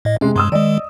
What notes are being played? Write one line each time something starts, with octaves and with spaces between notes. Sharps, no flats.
A2 D#5
C3 G#3 C#4
G2 G#3 C6 D#6 E6
D#3 G#3 D5 D#5